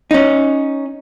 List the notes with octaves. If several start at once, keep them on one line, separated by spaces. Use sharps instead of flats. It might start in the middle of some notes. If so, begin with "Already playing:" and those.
C#4 D#4